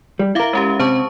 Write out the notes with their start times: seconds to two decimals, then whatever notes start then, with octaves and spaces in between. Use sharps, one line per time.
0.19 G3
0.35 E4 A#4 E5 F5 D6
0.53 G#3 C#4 G4
0.79 C3 C5 A5 C#6